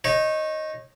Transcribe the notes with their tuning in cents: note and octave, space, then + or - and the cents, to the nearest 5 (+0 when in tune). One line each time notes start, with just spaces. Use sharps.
D#4 +0 C#5 -25